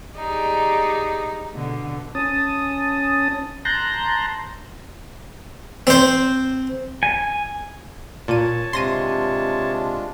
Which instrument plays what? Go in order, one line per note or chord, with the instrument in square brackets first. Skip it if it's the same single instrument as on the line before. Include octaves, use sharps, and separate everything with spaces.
[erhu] D#4 [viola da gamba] G4 G#4 D5
[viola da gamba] B2 D3
[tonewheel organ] C#4 A5 D#6
A5 A#5 C6 F#6 G6 A#6
[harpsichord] C4 C5
[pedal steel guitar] G#5
[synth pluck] A#2 D#7 [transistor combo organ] C#5 A5
[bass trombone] C3 [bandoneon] G#3 D4 F4 [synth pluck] C6 A#6 D#7